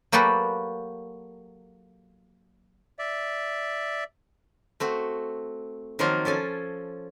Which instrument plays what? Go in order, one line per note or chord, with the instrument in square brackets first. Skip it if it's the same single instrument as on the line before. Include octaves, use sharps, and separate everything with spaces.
[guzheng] F#3 A#3 F#4 G4 A4 B4
[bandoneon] D5 E5
[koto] A3 C4 F#4
D#3 F3 F#3 A#3 C4 F4
F3 C#4 A4 G#5